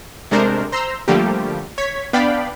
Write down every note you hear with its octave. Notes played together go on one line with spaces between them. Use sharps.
C3 G#3 A3 D4 A#4 C5
C5 A#5 C6 E6
D3 F3 G3 A3 A#3 G4
C#5 G#6 B6
B3 D4 D5 F5 G5 B5